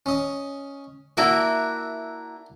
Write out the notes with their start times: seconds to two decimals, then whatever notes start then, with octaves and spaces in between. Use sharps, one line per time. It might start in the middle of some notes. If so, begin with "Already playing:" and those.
0.06 C#4 D#5
1.17 A#3 D4 E4 F#4 E5 A#5